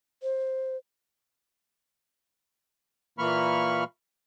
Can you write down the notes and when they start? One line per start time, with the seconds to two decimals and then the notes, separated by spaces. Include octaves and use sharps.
0.23 C5
3.19 A#2 E3 A#3 B5 C#6 F6